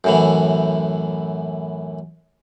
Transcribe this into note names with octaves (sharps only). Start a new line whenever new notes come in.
F#2 A2 E3